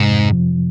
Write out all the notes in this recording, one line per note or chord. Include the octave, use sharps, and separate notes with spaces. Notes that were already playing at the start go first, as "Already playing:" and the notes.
Already playing: G#2 C3
F2
F3